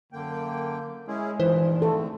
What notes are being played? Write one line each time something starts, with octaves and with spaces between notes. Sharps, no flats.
F#2 D3 A#3 G5
G#3 C#4 E4 G#4
G2 A#2 D#3 E3 C5
G#2 D3 A3 C4 A4